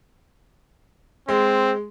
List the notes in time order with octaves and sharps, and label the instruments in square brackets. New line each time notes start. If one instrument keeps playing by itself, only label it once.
[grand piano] G#3 [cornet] C4